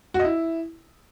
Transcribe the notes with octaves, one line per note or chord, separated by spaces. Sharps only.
F#4
D#5
E4